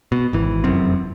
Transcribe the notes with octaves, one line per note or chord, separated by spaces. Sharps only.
B2
G#1 E3
F1 F#2 C4